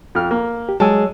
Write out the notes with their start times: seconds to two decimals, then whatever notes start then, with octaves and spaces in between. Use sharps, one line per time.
0.15 F2 F6
0.31 A#3
0.69 G4
0.80 F#3 G#3 C#5 G#5 A5 E6